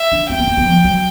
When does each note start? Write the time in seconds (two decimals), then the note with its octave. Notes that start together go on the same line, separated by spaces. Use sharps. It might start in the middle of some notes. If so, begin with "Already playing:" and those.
Already playing: E5
0.12 D4
0.29 C4 G5
0.39 B3
0.47 A#3
0.57 B3
0.66 F3
0.84 F#3